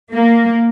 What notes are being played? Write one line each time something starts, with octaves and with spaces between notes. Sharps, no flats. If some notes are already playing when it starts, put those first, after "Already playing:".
A#3